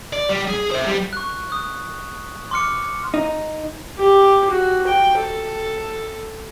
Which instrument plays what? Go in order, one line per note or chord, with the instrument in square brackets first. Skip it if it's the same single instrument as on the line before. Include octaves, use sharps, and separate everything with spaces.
[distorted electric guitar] D5
G3
G#4
C5 E5
G3
[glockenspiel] C#6 F#6
D#6 F#6
C6 D6 F6 C#7
[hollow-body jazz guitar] D#4
[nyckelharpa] G4
F#4
G5
A4